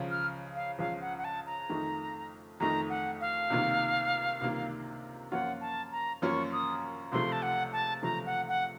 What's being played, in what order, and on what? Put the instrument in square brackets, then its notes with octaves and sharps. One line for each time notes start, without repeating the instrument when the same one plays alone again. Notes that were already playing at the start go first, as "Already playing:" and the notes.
Already playing: [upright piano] C#2 C#3 F3
[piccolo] F6
F5
[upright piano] C#2 C#3 F3 [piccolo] F5
[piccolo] F#5
F#5
A5
A#5
[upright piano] F2 D#3 A3 D#4
[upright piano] F2 D#3 A3 D#4 [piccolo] A#5
[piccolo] F#5
F5
[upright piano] C#2 C3 D#3 A#3 F4
C#2 C3 D#3 A#3 F4
[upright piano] F#2 F3 A#3 C#4 F4 [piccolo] F#5
[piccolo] A5
A#5
[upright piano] F#2 F3 A#3 C#4 F4 [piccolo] C#6
[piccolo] D#6
[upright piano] C#2 C3 F3 A3 [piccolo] C6
[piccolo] A5
F#5
A5
[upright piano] C#2 C3 F3 A3 [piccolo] A#5
[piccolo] F#5
F#5